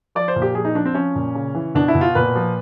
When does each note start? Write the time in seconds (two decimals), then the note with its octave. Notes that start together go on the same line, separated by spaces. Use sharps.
0.15 F3 D5
0.28 C5
0.36 A#2
0.42 G4
0.55 F3 G#4
0.65 D#4
0.75 F3 D4
0.85 C4
0.95 F3 C#4
1.15 A#2
1.35 C#3
1.54 E3
1.75 B2 D4
1.88 E4
1.95 B2
2.01 F4
2.15 A#2 B4
2.36 F3